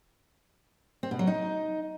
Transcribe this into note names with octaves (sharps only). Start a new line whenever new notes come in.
C4
B2
F#3
D#4